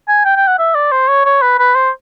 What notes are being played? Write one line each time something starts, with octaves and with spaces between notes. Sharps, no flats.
G#5
G5
G5
F#5
E5
D5
C5
C#5
C#5
B4
B4
C5